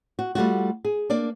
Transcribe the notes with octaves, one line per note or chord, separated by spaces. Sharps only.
F#4
G3 A3 F4 F#4
G#4
A#3 D4 D5